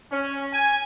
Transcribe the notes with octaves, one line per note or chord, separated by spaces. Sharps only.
C#4
G#5